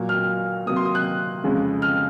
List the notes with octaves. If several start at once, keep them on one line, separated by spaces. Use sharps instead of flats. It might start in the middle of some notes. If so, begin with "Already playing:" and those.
Already playing: A#2 F#3 A#3
F6
C3 F#3 A#3 D#6
C6
D#6
F#6
F2 C#3 G#3
F6